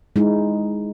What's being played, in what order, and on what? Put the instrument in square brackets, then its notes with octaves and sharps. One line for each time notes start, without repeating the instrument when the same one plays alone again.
[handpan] G#3 D#4 E4